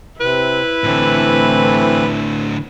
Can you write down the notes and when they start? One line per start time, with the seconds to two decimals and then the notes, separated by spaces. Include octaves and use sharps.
0.20 C3 E4 B4
0.84 A2 D3 E3 A3 C4